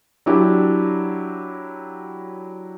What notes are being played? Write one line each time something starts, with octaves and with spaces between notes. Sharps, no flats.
F#3 D4 E4 G4